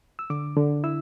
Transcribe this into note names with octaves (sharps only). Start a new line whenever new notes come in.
E6
D3 D6
D3
E4 E6